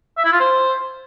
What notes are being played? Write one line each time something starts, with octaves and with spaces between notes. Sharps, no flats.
E5
E4
F4
C5